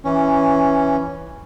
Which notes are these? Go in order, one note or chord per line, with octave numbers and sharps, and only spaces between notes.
E3 C#4